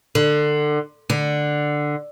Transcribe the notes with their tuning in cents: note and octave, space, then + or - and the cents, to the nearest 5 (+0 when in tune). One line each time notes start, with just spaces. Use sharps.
D3 +25
D3 +10